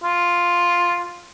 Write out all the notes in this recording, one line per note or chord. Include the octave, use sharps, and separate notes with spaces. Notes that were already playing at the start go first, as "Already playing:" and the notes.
F4